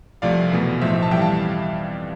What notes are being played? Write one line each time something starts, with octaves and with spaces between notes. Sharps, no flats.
C2 C3 F3 A3 D5 F5
E2 B2 A3
B1 A2 F3 A3 C5 E5
A5
F2 E3 G3 E5 G5
F5 A5